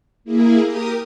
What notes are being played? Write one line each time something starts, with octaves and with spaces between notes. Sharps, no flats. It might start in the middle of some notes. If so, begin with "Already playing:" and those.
A#3 E4 G#4
G4 A#4 D#6